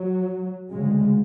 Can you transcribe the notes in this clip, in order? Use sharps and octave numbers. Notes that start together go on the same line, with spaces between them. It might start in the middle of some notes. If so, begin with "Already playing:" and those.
Already playing: F#3
D2 C#3 G#3